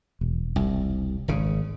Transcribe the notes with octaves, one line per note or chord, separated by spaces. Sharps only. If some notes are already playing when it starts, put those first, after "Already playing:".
E1
C2
G#1 C#3